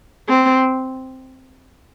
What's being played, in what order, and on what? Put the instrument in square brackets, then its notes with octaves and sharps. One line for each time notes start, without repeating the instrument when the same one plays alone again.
[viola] C4